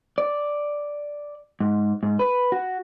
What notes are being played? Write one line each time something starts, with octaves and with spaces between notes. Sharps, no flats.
D5
G#2
G#2
B4
F#4